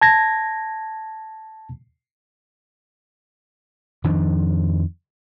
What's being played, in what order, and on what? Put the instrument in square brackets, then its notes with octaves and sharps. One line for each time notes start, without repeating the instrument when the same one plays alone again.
[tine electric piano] A5 G#6 A#6
[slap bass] F2 D#3 F3 D4